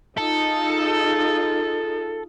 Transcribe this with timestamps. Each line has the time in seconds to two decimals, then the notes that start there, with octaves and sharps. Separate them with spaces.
0.18 D#4 F4 G#4 A4